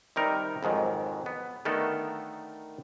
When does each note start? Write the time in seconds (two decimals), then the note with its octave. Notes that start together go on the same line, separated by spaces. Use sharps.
0.16 C3 D#3 G3 D#4 A#4 B4
0.63 F2 G#2 D#3 F#3
1.26 B3
1.65 D3 D#3 A3 B3 A4 A#4